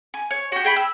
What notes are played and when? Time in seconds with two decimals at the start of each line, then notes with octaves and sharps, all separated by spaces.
0.14 G#5
0.31 C#5
0.52 F#4 G4
0.64 G#4 G5 B5
0.77 E6